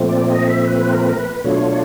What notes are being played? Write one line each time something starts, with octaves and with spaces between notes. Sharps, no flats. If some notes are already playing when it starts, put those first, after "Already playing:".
Already playing: A#2 F3 A3 C4
D5
D#5
E5
B4
A#4
B4
A#4
B4
B2 F#3 A3 D4 F4 C#5